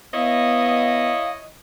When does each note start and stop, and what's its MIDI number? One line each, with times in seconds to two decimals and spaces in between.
0.14 1.12 59
0.14 1.55 64
0.14 1.55 73
0.14 1.55 75
0.14 1.30 77